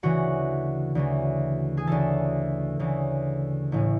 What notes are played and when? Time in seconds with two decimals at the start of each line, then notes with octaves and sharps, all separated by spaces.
0.03 D2 C#3 E3 F#4
0.95 D2 C#3 E3
1.77 G#4
1.87 D2 C#3 E3 A4
2.79 D2 C#3 E3
3.72 A1 A2 E3